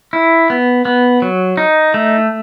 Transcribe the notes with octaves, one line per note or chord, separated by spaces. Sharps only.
E4
B3
B3
F#3
D#4
A3